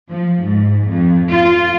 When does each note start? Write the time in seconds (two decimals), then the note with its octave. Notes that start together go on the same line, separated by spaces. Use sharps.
0.10 F3
0.42 G#2
0.90 F2
1.28 F4